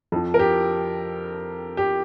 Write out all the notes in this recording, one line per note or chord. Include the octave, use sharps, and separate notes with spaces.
F2 F3
A#4
G4
G4